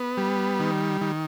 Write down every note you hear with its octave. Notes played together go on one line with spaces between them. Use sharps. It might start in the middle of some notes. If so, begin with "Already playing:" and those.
Already playing: B3
G3
D#3
D#3